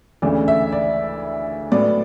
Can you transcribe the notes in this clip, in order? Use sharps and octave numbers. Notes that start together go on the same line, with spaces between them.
D2 C#3 E3 A3 D5
E5
D5
A2 F#3 B3 D5